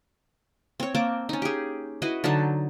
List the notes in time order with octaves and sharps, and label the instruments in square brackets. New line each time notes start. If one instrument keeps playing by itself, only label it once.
[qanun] C4 C#5
A#3 C4 A5 D6
C#4 D#4
G4 G#4
E4 F#4 B4 D#5
D3 F#3 D#4 A5